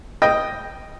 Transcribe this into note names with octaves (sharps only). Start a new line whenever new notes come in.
D#5 G5